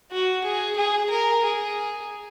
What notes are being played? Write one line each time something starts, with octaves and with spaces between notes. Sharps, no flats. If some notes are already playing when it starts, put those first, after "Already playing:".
F#4
G#4
G#4
A#4
G#4